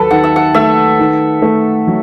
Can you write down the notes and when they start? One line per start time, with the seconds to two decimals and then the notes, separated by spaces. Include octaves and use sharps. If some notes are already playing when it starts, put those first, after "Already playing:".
Already playing: D#2 F#3 A4 B4
0.11 D#3 F#5
0.24 E5
0.36 F#5
0.54 A3 E5
0.99 D#3
1.42 A3
1.87 F#3